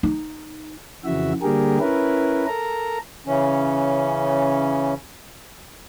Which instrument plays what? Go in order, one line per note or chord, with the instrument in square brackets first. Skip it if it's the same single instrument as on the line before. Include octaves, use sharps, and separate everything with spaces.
[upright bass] D#4
[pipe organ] F2 C#3 E3 F#4 E5
D3 G3 A#3 G4 G#4 A#4
C#4 E4 A#4 B4
A4 A#4 A#5
[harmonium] C#3 E3 C#4